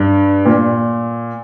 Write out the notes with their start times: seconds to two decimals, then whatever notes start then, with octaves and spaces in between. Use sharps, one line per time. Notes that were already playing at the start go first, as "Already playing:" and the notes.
Already playing: G2
0.46 A#2